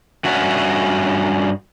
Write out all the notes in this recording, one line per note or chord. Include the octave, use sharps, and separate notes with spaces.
G2 C#4 F#4 C#5 E5 F#5